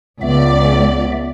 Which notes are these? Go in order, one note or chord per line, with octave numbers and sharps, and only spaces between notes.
C#2 B3 D5 E5